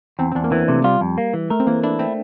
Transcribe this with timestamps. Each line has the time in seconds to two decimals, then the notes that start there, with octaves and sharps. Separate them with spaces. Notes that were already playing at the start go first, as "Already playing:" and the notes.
0.19 E2 C4
0.32 C4
0.35 E2 D4
0.44 A#3
0.51 E3 C4
0.68 C3 A3
0.84 G3 F4
1.01 F2
1.18 A#3
1.34 E3
1.50 A3 A#4
1.60 C4
1.67 E3 A#3
1.83 D4 E4
1.99 A3 C4